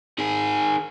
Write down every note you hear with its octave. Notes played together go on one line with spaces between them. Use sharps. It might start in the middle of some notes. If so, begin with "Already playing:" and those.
D#3 G#4